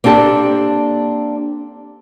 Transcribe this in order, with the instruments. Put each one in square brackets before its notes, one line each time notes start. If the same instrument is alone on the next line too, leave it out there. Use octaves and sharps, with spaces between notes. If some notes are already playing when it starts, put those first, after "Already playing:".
[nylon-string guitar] A#3 C4 D4 G4 A4